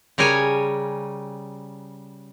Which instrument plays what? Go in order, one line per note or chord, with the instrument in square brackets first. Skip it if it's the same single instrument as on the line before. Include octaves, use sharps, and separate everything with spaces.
[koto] C#3 G3 A#4 C#5 G#5